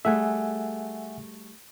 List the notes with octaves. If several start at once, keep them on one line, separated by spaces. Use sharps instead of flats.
G3 A3 G#4 E5 F#5 G#5